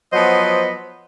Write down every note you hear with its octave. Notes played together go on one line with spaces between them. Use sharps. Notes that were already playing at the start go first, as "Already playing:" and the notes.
F3 F#3 B3 C5 D#5